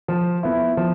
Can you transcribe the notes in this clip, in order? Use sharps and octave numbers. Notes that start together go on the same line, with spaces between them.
F3
B3 E4
F3